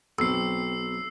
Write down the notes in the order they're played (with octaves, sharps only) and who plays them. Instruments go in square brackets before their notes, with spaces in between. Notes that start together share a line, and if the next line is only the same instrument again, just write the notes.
[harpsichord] B1 [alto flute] C4 [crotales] E6 C7